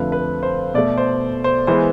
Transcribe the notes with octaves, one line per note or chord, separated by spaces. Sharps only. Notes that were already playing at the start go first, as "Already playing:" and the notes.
Already playing: F2 D3 F3 A3 B4
B4
C5
B2 A3 D5
C5
C5
E3 G#3 B3 C5